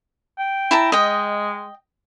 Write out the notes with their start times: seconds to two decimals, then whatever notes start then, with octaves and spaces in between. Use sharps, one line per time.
0.38 G5
0.71 E4 A5 A#5
0.92 G#3 D#5 G5